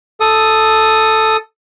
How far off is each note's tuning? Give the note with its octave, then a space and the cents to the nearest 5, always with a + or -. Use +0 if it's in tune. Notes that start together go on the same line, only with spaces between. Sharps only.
A4 +0 D#6 +0